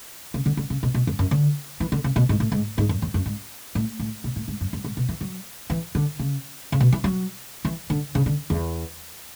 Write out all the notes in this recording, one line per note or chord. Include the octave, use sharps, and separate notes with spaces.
C#3
D3
D3
C#3
B2
B2
F#2
F#2
D3
E3
D3
C#3
B2
G#2
A2
G#2
G#2
F#2
E2
F#2
G#2
A2
A2
B2
A2
G#2
F#2
F#2
G#2
B2
E3
F#3
E3
D3
C#3
C#3
B2
E3
F#3
E3
D3
C#3
D3
E2